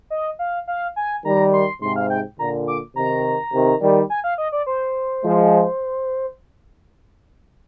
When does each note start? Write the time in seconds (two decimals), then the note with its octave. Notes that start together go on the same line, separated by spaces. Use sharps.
0.10 D#5
0.39 F5
0.67 F5
0.96 G#5
1.25 D#3 G3 A#5
1.53 C6
1.81 G#2 C3 C6
1.96 F5
2.10 G5
2.38 A#2 D3 A#5
2.68 D6
2.95 C3 D#3 A#5
3.52 C3 D#3
3.81 D#3 G3
4.10 G#5
4.24 F5
4.38 D#5
4.52 D5
4.67 C5
5.24 F3 G#3